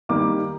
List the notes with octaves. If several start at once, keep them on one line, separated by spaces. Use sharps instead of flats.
D#3 G3 A#3 D6